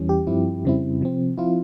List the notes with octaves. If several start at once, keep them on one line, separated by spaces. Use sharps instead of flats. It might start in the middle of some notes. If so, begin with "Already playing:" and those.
Already playing: E2 E3 G3 C#4
G4
G2 F3 C4 E4
F2 C#3 G3 C4 E4
C3 F3 C4
F3 C4 E4 F4